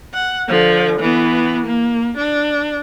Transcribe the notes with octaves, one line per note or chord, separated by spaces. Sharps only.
F#5
D3 F3
E3 B3
A#3
D4